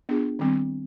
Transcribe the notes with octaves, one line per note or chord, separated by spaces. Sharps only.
B3 D4 F4 G#4
D#3 G3 C4